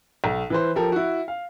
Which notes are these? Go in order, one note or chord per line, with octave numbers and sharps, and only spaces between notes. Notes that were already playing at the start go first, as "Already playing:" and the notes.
B1
E3 B4 C5
F3 G4 A4 A#4
E4 F#4
F5